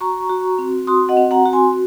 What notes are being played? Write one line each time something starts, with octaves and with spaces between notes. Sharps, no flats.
F#4 A#5 C#6
F#4
C4
F#4 C6 D#6
D#5 F#5
C4
F#5 A#5
F#4
G#5 C6